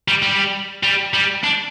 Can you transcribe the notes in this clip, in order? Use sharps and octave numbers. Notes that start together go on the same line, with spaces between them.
G3
G3
G3
G3
D4